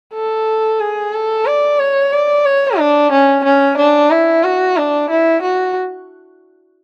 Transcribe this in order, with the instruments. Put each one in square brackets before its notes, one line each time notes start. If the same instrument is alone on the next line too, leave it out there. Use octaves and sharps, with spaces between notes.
[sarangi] A4
G#4
A4
D5
C#5
D5
C#5
D4
C#4
C#4
D4
E4
F#4
D4
E4
F#4